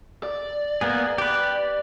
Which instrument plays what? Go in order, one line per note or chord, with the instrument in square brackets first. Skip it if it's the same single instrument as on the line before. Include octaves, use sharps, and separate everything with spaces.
[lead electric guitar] D5
[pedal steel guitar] A#3 B3 G#4
G4 B4